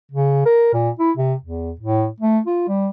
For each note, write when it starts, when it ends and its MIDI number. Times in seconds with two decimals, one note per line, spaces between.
0.12 0.45 49
0.46 0.73 70
0.73 0.90 46
0.99 1.11 64
1.17 1.34 48
1.43 1.72 40
1.80 2.08 45
2.20 2.39 57
2.47 2.66 65
2.68 2.90 55